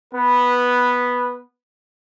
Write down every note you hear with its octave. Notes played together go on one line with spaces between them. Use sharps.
B3 B4